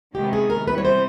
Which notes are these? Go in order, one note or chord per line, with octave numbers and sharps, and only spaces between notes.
C3 D#3 G#3 B3 G4
G#4
A#4
C3 E3 G3 B3 E4 B4
C#5
C5